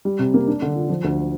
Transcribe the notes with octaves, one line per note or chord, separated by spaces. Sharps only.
G3
C3
A#3
D4
D3
F4
F3
D2